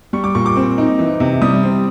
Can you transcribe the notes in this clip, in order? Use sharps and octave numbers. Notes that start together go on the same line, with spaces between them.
G3 C#6
D6
A#2 C#6
D6
C4
D#4
E3
C3
G3 D#6
C4